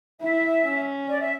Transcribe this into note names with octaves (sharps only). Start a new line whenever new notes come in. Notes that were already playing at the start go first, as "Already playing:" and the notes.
E4 E5
C#4
D5
E5